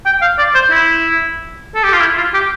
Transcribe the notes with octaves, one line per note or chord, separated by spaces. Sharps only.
G5
F5
D5
C5
E4
A4
G4
F4
E4
F4
G4